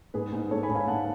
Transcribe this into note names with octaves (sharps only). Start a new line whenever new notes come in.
G#2 G#4 B4
G#2
G#2 A4 C#5
G#5 B5
G#2
F5 G#5
G#2 F#5 A5